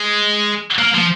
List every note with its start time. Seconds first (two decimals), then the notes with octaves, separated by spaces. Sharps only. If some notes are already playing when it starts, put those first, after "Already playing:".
Already playing: G#3
0.79 A#3
0.94 F3